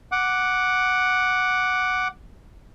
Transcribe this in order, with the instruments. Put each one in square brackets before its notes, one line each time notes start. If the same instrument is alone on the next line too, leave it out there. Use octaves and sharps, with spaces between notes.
[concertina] F#5 D6